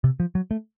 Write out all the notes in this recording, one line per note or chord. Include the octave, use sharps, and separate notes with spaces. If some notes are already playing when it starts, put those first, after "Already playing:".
C3
F3
F#3
A3